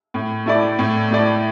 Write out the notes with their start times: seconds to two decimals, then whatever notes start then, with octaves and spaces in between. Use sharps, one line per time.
0.14 A2
0.46 A3 E4 D5
0.79 A2
1.11 A3 E4 D5